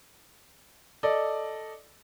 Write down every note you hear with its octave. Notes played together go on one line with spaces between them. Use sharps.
A4 D5 D#5